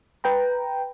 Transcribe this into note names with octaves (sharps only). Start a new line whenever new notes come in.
B4 G5 A#5